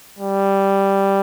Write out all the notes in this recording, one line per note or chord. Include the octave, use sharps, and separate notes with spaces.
G3